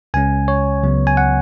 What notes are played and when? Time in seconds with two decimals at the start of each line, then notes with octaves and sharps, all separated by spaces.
0.14 C#2 C#3 G#3 C#4 G#5
0.48 C#5
0.83 C#2 C#3 F#3 B3
1.07 G#5
1.17 F#5